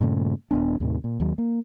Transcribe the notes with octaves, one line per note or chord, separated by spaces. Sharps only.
G2 A#2 C#3 A3
D#1 A#2 B3 D4
D#2 A2 C3 D#3
A#2
D#2 F#3
A#3